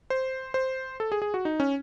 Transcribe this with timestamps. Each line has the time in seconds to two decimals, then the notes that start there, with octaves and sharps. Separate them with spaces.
0.10 C5
0.54 C5
1.00 A4
1.12 G#4
1.22 G#4
1.34 F#4
1.45 D#4
1.60 C#4